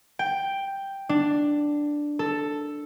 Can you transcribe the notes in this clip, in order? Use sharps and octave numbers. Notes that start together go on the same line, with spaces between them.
G5
D4
A4